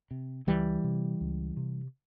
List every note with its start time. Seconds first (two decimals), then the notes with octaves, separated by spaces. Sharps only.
0.11 C3
0.47 C#2 E3 G3
0.84 C3
1.21 C#2
1.57 C3